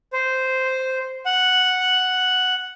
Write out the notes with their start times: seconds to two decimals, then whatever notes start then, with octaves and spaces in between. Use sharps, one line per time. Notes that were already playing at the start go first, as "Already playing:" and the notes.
0.13 C5
1.26 F#5